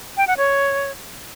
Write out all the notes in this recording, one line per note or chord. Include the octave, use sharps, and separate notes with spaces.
G5
F#5
C#5